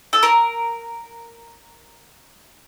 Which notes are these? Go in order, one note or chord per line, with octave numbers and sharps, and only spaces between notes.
A4
A#4